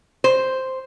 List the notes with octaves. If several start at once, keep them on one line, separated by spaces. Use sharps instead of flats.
C5